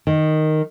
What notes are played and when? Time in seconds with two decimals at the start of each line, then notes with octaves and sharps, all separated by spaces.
0.07 D#3